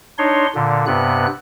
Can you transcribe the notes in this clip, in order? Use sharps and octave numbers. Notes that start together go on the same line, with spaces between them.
D4 D#4 C#5 C6
A#2 D3
G2 C3 B3 F#6